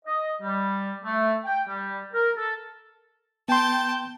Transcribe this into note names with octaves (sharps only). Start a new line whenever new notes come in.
D#5
G3
A3
G5
G3
A#4
A4
B3 G5 A5 C6 G6